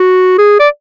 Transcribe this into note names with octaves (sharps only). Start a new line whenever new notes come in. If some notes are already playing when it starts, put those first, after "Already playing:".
Already playing: F#4
G#4
D5